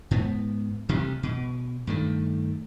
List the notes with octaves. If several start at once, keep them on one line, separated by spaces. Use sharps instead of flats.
G#2 B3
D2 C3 G3
B2
G2 D#3 A3